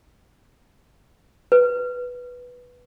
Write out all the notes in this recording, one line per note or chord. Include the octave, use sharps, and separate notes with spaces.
B4